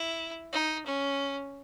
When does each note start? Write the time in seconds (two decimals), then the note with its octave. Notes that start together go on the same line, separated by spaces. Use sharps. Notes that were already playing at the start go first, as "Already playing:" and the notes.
Already playing: E4
0.53 D#4
0.86 C#4